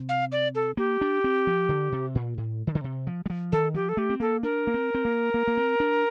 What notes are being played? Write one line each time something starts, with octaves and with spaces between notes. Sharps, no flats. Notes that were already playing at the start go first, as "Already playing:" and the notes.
Already playing: C3
F5
D5
A4
A#3 G4
D4
C4
F3
D3
C3
A#2
A2
D#3
D3
C3
F3
G3
F3
D#3 A4
F3 G4
A4
A3 G4
C4
A#3 A4
D4 A#4
A#3
C4
C4
A#3
A#3
A#3
C4
D4